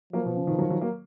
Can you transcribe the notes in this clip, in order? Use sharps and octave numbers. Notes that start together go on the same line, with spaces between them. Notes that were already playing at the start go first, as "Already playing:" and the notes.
F3 F#3 A#3
B2
C#3
B2 D#3
D#3 F#3
D#3 F#3
F#3 A#3